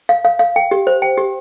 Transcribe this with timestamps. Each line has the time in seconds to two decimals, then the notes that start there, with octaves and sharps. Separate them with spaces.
0.09 F5
0.25 F5
0.39 F5
0.56 G5
0.71 G4
0.87 C5
1.02 G5
1.18 G4